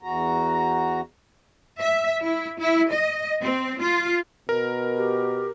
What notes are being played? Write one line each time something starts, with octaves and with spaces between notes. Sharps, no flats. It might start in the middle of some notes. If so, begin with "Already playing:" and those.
E2 F#4 A#5
E5
E4
E4
D#5
C4
F4
B2 A#4
G4